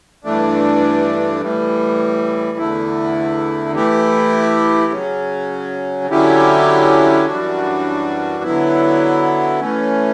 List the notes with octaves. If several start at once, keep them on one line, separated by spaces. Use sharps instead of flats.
G2 E3 A3 D4
A2 E3 G3
E2 D3 A3 E4
E3 A3 E4 G4
C#3 F#3 C#4
D3 F#3 C#4 E4 G4
F#2 E3 G3 D4 F#4
D3 F#3 B3 E4
E3 A3 C#4